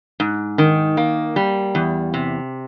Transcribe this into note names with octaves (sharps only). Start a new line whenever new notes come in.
G#2
D#3
A#3
G3
E2
C3